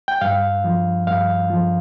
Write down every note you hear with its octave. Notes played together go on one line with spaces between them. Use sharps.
G5
G2 F5
F3
G2 F5
F3